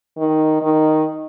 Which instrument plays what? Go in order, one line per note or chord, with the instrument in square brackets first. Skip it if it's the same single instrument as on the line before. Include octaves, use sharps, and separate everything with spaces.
[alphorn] D#3
D#3